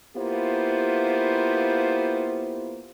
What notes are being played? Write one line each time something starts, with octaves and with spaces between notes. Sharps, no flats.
A#3 B3 E4 F4 G4 C5